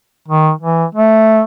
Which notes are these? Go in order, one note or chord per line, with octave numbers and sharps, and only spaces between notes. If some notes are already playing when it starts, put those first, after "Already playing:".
D#3
E3
A3